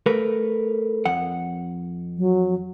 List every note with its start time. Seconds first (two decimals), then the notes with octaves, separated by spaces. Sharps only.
0.06 A3 A#4 B4
1.06 F2 F#5
2.18 F#3